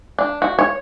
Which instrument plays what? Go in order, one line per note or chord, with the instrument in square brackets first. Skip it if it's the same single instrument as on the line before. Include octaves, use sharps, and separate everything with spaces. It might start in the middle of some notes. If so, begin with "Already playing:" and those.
[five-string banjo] D4
F#4
C#5